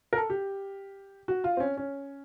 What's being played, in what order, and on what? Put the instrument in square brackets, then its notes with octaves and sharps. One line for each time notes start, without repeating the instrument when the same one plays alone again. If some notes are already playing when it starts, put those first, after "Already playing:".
[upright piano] A#4
A4
G4
F#4
F4
C4
C#4
C#4